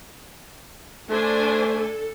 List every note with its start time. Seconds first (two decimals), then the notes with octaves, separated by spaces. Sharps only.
1.10 A3 D4 C5 G#5
1.76 A4